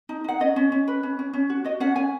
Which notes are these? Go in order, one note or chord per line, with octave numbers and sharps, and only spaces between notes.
D#4
D#4 F#5
C#4 D#5
C#4
C#4
B4
C#4
C#4
C#4
F#4
F#4 D#5
C#4 F#5
C#4 G#5